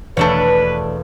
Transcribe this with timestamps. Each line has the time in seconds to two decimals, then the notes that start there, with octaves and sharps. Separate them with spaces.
0.17 E1 A3 D4 A4 B4 C#5